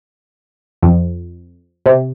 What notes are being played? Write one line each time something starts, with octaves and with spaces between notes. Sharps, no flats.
F2
C3